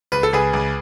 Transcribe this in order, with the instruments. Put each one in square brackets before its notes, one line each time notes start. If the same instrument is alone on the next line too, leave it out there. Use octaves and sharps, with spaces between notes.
[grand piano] C#2 B4
A4
C#2 G#4 B4
C#2